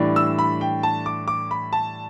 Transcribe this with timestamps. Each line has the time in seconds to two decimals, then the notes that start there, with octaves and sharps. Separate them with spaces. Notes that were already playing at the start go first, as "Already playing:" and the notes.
Already playing: A2 E3 G3 D4
0.16 E6
0.39 B5
0.61 G5
0.83 A5
1.06 D6
1.28 D6
1.51 B5
1.73 A5